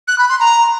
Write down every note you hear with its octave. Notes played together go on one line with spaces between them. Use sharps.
F#6
B5
C6
A#5